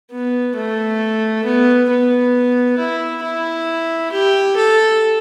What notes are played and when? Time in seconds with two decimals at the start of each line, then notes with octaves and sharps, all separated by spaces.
0.11 B3
0.55 A3
1.44 B3
1.89 B3
2.79 E4
3.23 E4
4.12 G4
4.57 A4